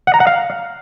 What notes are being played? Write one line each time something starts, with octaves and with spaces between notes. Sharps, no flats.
F#5
A#5
F#5
F5